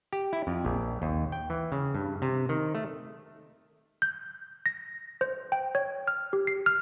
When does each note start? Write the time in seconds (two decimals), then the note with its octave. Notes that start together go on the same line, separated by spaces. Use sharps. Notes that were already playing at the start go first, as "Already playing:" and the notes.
0.13 G4
0.33 E4
0.47 F2
0.65 A#1
1.02 D#2
1.32 G5
1.50 E3
1.72 C#3
1.95 G2
2.22 C3
2.49 D#3
2.75 A3
4.02 G6
4.66 A#6
5.21 C5
5.52 G5
5.75 C#5
6.08 F6
6.33 G4
6.47 C7
6.66 F6